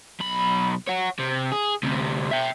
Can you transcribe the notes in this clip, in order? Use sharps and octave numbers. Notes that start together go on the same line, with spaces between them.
B1 B5
C#5 F#5
C3
G#4
D2 C3
E5 G5